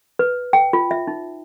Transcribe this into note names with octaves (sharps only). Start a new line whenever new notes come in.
B4
G5
F4
E5
D#4